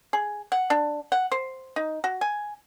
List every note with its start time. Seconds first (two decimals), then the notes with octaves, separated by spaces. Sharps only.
0.13 G#4
0.52 F#5
0.70 D4
1.12 F#5
1.32 C5
1.76 D#4
2.04 F#4
2.21 G#5